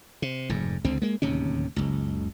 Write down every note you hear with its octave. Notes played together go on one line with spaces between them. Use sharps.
C3
F1 G#2
C#2 D3 C4
G#3 A#3
D1 D#2 C3 C#4
F#1 C#2